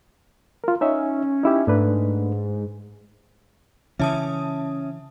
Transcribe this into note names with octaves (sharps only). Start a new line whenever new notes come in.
F4 A#4
C#4 D#4 C#5 E5
D#4 E4 G4
G#2 A3 D4 B4
C#3 E3 C#4 E5 A5 D#6